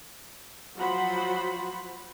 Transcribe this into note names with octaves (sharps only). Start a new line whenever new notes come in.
F3 F#3 F#4 C5 F#5 B5